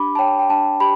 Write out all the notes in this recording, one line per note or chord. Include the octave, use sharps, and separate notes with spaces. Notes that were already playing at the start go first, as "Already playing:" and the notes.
Already playing: D4 G4 B5 D6
A5
C#5 G5
G5
D4 A5
G4 B5